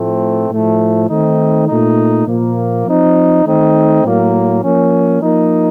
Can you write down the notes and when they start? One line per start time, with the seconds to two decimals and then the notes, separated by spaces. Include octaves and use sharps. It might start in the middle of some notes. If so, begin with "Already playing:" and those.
Already playing: A2 F3 A3 C4
0.50 A2 F3 A3
1.09 D#3 A3 C4 D#4
1.68 A#2 A3 D#4
2.27 A#2 F3 A#3
2.87 F3 C4 D#4
3.45 D#3 A3 C4 D#4
4.04 A2 F#3 A#3
4.63 F3 A#3 C#4
5.22 F3 A#3 D#4